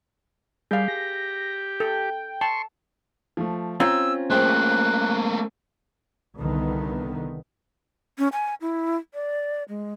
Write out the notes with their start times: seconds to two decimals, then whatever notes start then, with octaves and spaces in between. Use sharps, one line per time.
0.71 G3 G4 G#4 F5
0.88 A#6
1.80 A4 G5
2.41 A5 C6 C#6
3.37 F3 A3
3.80 C4 C#4 F4 A#5 E6
4.30 A3 A#3 G#4 C5 G5 F#6
6.38 C2 D3 D#3 B3
8.18 C#4
8.33 G#5
8.61 E4
9.14 D5
9.69 G#3